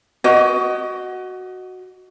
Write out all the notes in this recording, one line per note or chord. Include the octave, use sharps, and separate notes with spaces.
F#4 D#5